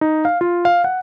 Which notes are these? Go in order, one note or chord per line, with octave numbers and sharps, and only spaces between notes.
D#4
F5
F4
F5
F#5